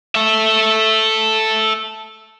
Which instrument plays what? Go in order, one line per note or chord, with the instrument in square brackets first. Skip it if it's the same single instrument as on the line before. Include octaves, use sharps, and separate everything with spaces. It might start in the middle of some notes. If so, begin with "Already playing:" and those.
[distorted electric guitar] A4 E5